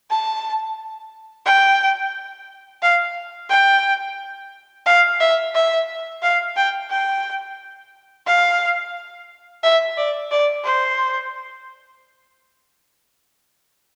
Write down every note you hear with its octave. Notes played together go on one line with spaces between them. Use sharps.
A5
G5
F5
G5
F5
E5
E5
F5
G5
G5
F5
E5
D5
D5
C5